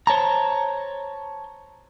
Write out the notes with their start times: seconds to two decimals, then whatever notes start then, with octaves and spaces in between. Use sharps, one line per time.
0.07 C5 C#5 A5 A#5